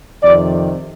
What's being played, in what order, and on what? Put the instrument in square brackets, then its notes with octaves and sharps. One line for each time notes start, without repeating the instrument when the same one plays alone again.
[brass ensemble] F2 C3 D#3 D5